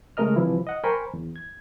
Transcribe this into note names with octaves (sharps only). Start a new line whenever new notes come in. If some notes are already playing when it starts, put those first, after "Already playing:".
C#3 G#3 A3 A#4 D#5 F6
C3 E3 F3 G3 E4
D#5 F#5
A#4 C5 G5 G#5 B5 C#6
E2
G#6